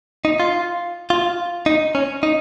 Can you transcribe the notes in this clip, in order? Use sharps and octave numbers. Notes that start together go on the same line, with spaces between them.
D#4
F4
F4
D#4
C#4
D#4